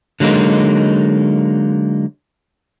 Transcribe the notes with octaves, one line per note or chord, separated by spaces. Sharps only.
D3 F#3 G#3 A#3 D#4